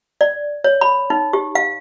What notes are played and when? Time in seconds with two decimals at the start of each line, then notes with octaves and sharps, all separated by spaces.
0.21 D5
0.64 C#5
0.81 B5
1.10 D#4
1.33 G4
1.55 F5